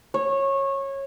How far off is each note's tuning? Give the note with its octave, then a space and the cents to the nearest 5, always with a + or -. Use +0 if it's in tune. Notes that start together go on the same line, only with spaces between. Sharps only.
C#5 -20